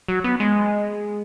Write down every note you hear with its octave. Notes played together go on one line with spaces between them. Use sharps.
F#3
B3
G#3